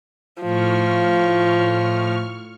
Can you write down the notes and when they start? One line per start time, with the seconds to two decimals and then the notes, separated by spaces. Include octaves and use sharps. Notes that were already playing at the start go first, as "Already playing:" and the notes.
0.42 A2 F3 C#6 F6